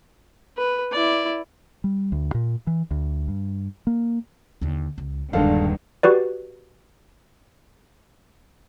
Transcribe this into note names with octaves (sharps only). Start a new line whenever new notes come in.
B4
E4 D5
G3
D2
A#2
E3
D2
G2
A#3
D#2 D3
C#2
D#1 G2 D3 D#3 G#3 D4 A4 F5
F#4 G4 B4 D5